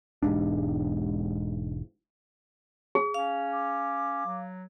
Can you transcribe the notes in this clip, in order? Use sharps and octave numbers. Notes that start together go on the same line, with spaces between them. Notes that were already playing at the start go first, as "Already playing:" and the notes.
E1 A#1 G#2 D4
G#4
C#4 F5
D6
F#3